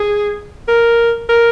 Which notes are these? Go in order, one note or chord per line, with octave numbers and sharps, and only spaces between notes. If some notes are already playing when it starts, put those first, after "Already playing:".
Already playing: G#4
A#4
A#4